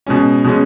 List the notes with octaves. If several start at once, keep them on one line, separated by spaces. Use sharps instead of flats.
B2 G#3 C#4
B2 G#3 C#4